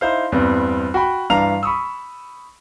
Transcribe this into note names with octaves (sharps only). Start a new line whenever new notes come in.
D#4 E4 C5 F5
E2 G2 G3 B3 C4
F#4 G5 B5
G2 E3 D4 F5 A#5 F7
B5 C#6 D#6 E6